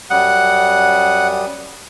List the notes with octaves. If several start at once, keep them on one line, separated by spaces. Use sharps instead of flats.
F#2 G3 F#5 D#6